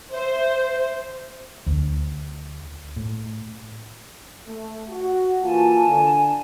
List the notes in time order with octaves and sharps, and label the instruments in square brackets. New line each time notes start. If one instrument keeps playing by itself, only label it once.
[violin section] C5 [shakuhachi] E5
[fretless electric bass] D2
A2
[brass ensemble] A3
F#4
[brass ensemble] E3 A#3 F4 [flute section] G#5 A5
[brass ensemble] D3